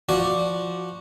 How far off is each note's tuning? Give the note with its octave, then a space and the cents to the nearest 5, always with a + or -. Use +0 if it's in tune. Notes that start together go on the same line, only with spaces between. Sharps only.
F3 -10 F#4 -5 D5 +0